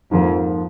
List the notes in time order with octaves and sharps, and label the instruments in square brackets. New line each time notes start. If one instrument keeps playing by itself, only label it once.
[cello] F2 [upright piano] G#2 F3 A#3